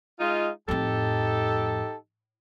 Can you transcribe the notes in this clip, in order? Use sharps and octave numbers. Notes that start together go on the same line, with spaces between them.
G#3 D#4 F4
F2 A2 D#4 G4 A4